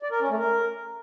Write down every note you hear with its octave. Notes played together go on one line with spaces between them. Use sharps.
D5
A#4
C#4
A3
A#4